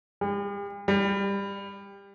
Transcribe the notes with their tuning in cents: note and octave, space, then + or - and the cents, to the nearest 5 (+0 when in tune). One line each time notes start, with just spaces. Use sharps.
G3 +45
G3 +20